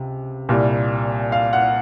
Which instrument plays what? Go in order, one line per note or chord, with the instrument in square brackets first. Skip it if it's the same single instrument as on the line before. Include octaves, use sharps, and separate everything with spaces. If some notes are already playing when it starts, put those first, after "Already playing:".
Already playing: [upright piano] C#2 C3
C2 A#2 G3
F5
F#5